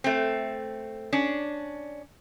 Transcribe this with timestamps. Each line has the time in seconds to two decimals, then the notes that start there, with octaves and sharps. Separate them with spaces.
0.04 A3 C4
1.13 C#4 D4